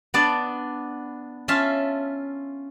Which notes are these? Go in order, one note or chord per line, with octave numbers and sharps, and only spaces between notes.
B3 D4 D5 A5
C#4 F4 E5 F5 A5